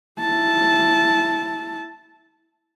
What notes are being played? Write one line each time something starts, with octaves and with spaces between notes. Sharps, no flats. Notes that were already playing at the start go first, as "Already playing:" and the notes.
E4 A5